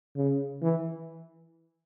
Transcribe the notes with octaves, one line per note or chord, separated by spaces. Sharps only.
C#3
E3